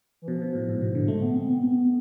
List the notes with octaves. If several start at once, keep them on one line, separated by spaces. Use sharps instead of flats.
E3
B2 F3
B2
A2
G#2
B2
D3
G#3 A3
B3
C4
B3
C4
B3